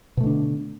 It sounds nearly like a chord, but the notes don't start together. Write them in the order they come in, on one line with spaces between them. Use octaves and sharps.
B2 A3 D3 D4